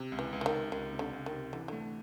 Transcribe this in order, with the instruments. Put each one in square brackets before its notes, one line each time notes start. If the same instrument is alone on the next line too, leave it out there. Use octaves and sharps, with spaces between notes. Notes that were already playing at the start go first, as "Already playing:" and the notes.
Already playing: [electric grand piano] C3
C#2
[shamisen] E3
[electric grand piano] C#2
[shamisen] E3
D#3
[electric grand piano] C#2
[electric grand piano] C#2 [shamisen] D#3
[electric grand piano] C3
[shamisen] D3
[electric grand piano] C#2
[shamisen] D#3
[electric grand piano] C3
[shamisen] D3 [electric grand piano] E3
[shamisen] D3 [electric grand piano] A3